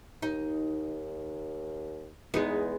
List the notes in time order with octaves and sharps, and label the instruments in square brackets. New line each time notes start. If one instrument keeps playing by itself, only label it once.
[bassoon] D#2 [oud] D#4
[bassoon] E2 [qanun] G#3 B3 [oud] D#4